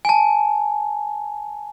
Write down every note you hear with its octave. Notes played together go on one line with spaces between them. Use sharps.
G#5 A5